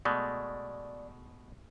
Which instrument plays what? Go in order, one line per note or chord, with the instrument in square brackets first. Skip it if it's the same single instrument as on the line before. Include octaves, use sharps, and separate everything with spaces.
[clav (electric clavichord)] B2 G#3 A3 [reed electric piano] D5